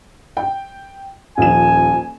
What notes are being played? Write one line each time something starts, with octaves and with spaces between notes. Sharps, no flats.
G5
D#1 F3 G#5 E7